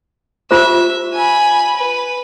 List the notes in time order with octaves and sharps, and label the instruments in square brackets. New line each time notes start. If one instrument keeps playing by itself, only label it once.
[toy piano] F4 G4 C5 [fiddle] E5
[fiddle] G#5 B5
B4